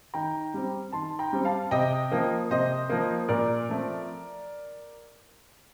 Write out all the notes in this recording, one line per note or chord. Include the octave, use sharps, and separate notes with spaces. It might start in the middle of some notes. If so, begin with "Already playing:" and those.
D#3 G5 A#5
G3 C4
D#3 A5 C6
G5 A#5
G3 C4
F5 A5
C3 D#5 G5
F3 A#3
C3 C5 D#5
F3 A#3
A#2 A#4 D5
F3 A3 C4